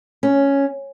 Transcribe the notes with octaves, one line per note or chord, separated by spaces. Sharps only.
C#4